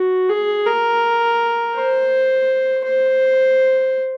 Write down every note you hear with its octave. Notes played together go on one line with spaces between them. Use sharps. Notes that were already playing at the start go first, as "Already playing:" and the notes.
Already playing: F#4
G#4
A#4
C5
C5